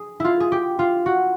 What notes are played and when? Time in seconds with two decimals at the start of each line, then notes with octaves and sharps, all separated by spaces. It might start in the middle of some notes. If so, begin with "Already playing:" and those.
Already playing: G#4
0.20 E4 F4
0.40 G#4
0.52 G4
0.79 F4
1.06 F#4